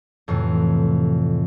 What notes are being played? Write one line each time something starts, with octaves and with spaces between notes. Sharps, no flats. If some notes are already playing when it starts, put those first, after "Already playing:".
F2 A2 C3 E3